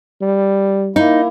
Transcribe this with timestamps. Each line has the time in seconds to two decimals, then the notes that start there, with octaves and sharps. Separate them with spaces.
0.22 G3
0.96 A#3 D#4 E4